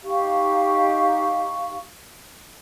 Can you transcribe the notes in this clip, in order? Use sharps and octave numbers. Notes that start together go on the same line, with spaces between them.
D#4 G4 F5 C#6